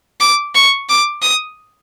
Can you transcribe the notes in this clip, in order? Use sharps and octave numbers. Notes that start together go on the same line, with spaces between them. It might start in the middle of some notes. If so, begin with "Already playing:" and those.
D6
C#6
D6
D#6